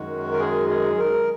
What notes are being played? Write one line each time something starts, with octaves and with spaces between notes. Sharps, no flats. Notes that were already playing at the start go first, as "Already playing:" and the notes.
Already playing: F#2 D#3 G#3 F#4
A#4
G#4
G#4
A#4